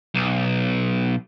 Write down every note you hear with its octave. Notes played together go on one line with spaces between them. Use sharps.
B1